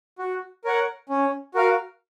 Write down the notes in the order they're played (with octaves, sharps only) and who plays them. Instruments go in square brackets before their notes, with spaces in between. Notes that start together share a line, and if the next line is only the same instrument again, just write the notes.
[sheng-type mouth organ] F#4
A#4 C#5 F#5
C#4
F#4 A#4 F5